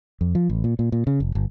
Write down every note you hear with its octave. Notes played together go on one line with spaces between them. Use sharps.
F2
F3
A1
A#2
A#2
A#2
C#3
F1
G1